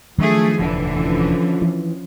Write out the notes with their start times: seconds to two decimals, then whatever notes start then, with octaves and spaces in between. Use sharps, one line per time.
0.18 D#3 F3 F#3 A3 D4 G#4
0.59 F1 D#2 A2 D3 E3
0.94 F3 C#4
1.62 E3